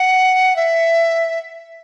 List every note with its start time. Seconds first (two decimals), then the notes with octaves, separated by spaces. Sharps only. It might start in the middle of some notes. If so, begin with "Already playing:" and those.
Already playing: F#5
0.56 E5